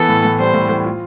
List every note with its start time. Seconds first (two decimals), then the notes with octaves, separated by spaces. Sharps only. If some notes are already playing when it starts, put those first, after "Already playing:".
Already playing: E3 B3 A4
0.09 A2
0.25 A2
0.39 G3 C5
0.54 A2
0.69 A2
0.84 F4